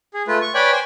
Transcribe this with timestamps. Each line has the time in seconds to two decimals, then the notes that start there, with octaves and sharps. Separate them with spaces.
0.14 G#4
0.28 A3 F4 B4
0.42 C#6
0.55 B4 C#5 D5 G5 G#5 B5
0.72 C5 G5 G#5